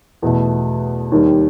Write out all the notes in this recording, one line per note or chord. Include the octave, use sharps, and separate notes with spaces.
E2 B2 A3
D#2 D#3 G3